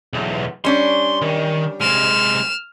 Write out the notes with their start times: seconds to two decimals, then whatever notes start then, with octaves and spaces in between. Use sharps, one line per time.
0.13 B1 E2
0.64 G3 C#4 D4 C6
1.22 D#3
1.81 C3 G#3 F6 E7